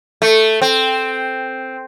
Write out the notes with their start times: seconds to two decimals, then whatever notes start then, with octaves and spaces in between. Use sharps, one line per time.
0.22 A3
0.62 C4